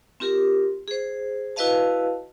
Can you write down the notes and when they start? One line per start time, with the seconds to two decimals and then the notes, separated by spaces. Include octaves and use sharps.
0.20 C4 F4 G4 A#4
0.88 G#4 C5
1.56 E4 F#4 B4 D#5 F5 A5